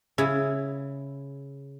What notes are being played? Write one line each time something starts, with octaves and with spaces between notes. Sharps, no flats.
C#3 E4